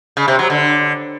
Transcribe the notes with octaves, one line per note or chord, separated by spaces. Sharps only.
C#3
C3
F#3
D3